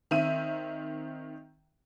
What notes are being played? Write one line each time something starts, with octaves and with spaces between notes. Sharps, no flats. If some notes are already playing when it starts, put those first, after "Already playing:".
D#3 C4 E5 D#7